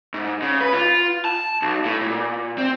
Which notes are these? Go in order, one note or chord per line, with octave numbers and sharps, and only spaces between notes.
G#2
C#3
B4
F4
A5
B1
A2
A#2
C4